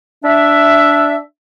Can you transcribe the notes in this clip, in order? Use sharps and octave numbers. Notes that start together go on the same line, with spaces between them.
D4 E5